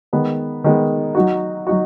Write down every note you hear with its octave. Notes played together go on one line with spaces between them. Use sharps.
D#3 G#3 B3
D#3 G#3 B3
F#3 D#4 F#4
F#3 D#4 F#4